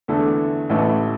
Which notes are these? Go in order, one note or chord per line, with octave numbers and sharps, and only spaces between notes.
E2 D3 A3 E4 A4
A1 A2 E3 A3